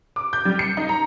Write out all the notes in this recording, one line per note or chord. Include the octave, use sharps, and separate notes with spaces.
D6
G6
G3
C#7
D#4
A#5